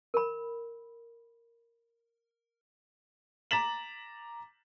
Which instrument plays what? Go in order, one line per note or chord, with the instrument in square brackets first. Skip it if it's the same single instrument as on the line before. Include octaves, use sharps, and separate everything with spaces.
[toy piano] A#4 B5
[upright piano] A#5 D6 A6 B6 E7 F#7